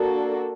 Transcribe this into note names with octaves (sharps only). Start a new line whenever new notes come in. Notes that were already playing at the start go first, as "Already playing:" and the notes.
Already playing: A#3 D4 F#4 A4